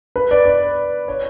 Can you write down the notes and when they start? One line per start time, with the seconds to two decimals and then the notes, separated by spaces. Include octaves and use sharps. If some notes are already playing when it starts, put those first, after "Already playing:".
0.16 B4
0.31 D5
0.46 D5
1.08 C#5